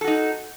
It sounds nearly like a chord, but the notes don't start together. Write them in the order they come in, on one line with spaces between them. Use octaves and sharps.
A4 F#4 D#4